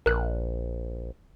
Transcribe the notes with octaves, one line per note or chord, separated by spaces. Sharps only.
A#1 A#4 F#6